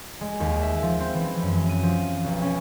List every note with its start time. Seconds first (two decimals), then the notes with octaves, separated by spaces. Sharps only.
0.21 G#3
0.40 D#2
0.62 E5
0.82 F3
1.00 C4
1.14 E3
1.42 F#2
1.69 D#7
1.83 F3
2.24 B1
2.42 C#4